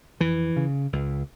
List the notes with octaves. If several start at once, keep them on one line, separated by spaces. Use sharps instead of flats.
F2 E3
C#3
C#2